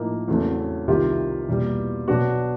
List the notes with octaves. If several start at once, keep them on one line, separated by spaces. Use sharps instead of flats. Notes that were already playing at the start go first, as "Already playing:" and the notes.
Already playing: A2 F3 A#3 D#4
E2 C#3 F#3 A3 C4
C2 C3 D#3 F4 G4
E2 B2 G3 A#3
B2 F#3 B3 D4 F#4